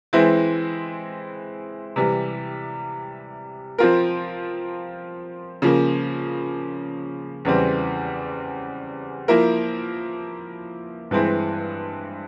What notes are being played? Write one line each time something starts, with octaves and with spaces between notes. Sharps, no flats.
E3 G#3 C4 E4
C3 E3 G3
F3 C4 F4 A#4
C#3 F3 A#3
E2 C#3 E3 G3 C4
F3 A#3 E4 A#4
G2 E3 G#3 C4 E4